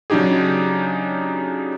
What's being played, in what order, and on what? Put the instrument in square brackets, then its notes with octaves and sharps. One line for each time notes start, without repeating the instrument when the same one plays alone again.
[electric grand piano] C#3 F#3 D4 D#4 G4 G#4